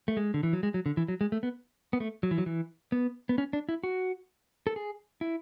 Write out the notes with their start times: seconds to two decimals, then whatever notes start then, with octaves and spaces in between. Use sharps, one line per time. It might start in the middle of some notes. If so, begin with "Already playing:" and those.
0.08 A3
0.17 G#3
0.34 D3
0.43 E3
0.53 F#3
0.63 G#3
0.74 F#3
0.86 D3
0.97 E3
1.08 F#3
1.21 G#3
1.32 A3
1.43 B3
1.93 B3
2.00 A3
2.23 F#3
2.31 E3
2.38 F#3
2.46 E3
2.92 B3
3.29 B3
3.38 C#4
3.53 D4
3.69 E4
3.84 F#4
4.67 A4
4.76 G#4
5.21 E4